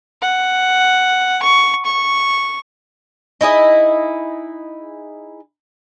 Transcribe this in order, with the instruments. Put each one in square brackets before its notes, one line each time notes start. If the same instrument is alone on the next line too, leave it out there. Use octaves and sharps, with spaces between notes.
[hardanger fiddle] F#5
C#6
C#6
[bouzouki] D#4 E4 G#4 D#5